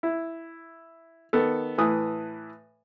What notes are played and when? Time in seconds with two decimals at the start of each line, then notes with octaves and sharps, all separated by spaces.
0.03 E4
1.33 D#3 B3 A4
1.78 A2 E3 B4 D#6